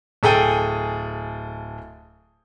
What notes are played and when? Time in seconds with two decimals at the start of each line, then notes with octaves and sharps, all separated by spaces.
0.23 D1 G#4 A4 G5 D#7